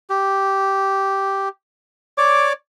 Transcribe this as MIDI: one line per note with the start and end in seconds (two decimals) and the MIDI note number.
0.10 1.49 67
2.18 2.53 73
2.18 2.53 74
2.18 2.53 86